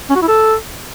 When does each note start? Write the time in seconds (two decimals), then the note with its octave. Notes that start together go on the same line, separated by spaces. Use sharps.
0.10 C#4
0.16 F#4
0.22 E4
0.28 A4